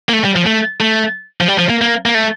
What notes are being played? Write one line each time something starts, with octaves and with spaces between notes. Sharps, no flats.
A#3
A3
G3
F3
A3
A3
F3
G3
F3
A#3
A#3
A#3
A3